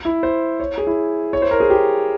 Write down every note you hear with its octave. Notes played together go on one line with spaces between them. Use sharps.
E4
C5
C#5
G#4
E4
C#5
C5
A#4
G#4
G4